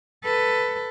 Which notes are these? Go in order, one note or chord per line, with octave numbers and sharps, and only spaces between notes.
A4 B4